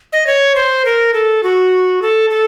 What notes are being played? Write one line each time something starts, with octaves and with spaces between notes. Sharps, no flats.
D#5
C#5
C5
A#4
A4
F#4
A4
A4